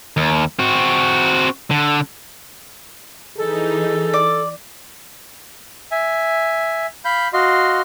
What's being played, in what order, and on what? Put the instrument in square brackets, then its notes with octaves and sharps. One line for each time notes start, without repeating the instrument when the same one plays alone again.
[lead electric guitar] D#2
C4 F#4
D3
[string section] E3 D#4 [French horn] G#4 [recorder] A4
[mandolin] D5
[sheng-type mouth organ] E5 G#5
F5 B5 G6
F#4 D#5 F5 C6